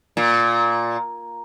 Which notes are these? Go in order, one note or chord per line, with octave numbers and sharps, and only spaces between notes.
A#2